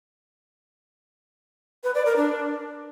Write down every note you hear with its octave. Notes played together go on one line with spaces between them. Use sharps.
B4
D5
A#4
D4